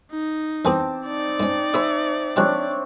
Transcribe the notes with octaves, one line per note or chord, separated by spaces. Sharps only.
D#4
E2 B3 C4 G#4 A5 D6
D#4 D5
G#2 C#4
G#4 C5 E5 B5
F3 G#3 C4 D4 G4 C#5